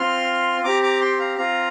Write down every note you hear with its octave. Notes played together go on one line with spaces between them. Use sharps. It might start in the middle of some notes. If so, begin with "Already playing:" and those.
Already playing: C4 F4 C6 F6
C4 G4 A#5 D6
A#5 D6
G5 C6
F5 A#5
C4 F4 F5 A#5